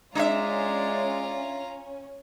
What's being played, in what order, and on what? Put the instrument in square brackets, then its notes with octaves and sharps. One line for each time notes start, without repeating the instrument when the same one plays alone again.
[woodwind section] G#3 D5 [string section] C#4 [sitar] D4 E5 [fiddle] F4 A#5